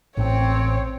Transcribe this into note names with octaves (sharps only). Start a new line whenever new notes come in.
A1 A2 C4 C#5